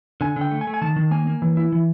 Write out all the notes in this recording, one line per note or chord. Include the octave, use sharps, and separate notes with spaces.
D3 G#5
D3
G5
A3
G#5
A3
G#5
D#3 A5
D#3
A#3 G#5
A#3
E3
E4
E3